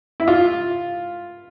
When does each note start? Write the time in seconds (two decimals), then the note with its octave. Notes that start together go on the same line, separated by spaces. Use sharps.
0.20 E4
0.28 F4